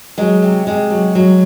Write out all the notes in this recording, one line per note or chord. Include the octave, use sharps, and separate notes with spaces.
F#3 G#3
C3
C3 G#3
F#3
F#3